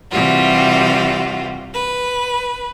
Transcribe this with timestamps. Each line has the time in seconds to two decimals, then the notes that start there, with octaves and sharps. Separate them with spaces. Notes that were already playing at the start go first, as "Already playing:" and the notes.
0.11 C3 E3 G3 F4 F#4
1.74 B4